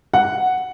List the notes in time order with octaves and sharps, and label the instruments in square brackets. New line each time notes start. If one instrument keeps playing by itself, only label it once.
[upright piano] F#5